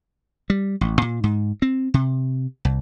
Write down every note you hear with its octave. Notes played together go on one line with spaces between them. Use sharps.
G3
A1
A#2
G#2
C4
C3
C2